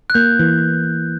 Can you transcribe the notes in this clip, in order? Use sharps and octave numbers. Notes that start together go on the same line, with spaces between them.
F#6
A#3 G6
E3